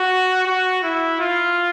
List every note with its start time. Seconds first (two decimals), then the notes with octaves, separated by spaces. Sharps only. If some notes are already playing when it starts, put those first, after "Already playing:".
Already playing: F#4
0.47 F#4
0.83 E4
1.20 F4